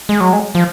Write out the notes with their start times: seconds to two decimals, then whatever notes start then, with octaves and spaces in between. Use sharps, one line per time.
0.09 G#3
0.20 F#3
0.33 G#3
0.55 F3